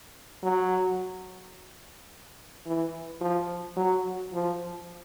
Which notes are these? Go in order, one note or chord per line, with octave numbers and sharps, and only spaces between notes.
F#3
E3
F3
F#3
F3